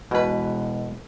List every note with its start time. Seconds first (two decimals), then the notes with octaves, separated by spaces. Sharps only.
0.11 E1 B2 G#3 B4